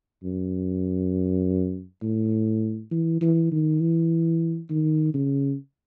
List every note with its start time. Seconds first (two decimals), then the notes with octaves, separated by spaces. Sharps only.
0.24 F#2
2.02 A2
2.91 E3
3.21 E3
3.52 D#3
3.81 E3
4.70 D#3
5.14 C#3